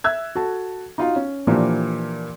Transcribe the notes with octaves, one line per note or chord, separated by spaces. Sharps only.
E5 E6 F#6 G#6
F#4 A4 A5
D#4 F4 F#4 F5
C#4
A#2 E3 F3 A#3 D4 G4